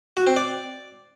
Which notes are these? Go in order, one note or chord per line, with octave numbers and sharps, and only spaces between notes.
F#4
C4
D5